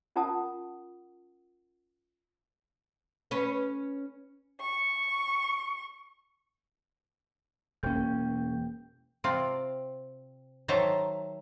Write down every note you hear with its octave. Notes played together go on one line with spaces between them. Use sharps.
C#4 F4 A#4 F#5 A5 D#6
C#4 B4
C#6
E1 A#3 C#4 G5 G6
C3 C4 F4 D5
D#3 F#3 C5 E5 A5 A#5